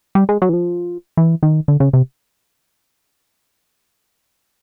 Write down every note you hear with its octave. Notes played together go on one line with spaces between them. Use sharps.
G3
G#3
F#3
E3
F3
E3
D#3
D3
C#3
C3